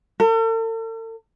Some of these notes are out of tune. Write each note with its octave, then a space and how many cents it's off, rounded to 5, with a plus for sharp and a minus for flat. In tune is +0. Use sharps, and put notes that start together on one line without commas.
A4 +45